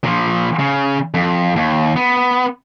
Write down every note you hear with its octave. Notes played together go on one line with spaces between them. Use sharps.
A#2 F3
C#3
F2
D#2
B3